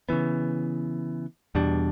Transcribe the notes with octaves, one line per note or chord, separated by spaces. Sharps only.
C#3 E3 B3
E2 B2 G3 D4